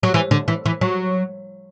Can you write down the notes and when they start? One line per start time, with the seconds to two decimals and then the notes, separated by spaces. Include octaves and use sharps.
0.03 F#3
0.14 E3
0.31 D3
0.48 E3
0.66 E3
0.81 F#3